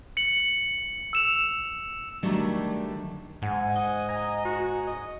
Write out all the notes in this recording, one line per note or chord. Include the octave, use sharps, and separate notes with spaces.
C#7 F#7
E6 E7 F7
D3 D#3 F#3 G3 A3 D4
G#2 F#5 G#5
D#5
G#5 A#5
F#4
D#5